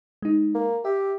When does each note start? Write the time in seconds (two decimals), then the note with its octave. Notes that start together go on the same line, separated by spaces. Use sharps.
0.22 G#3 D#4
0.55 A#3
0.85 G4 E5